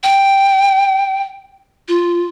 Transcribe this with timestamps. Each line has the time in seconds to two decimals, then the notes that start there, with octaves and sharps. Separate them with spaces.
0.03 G5
1.88 F4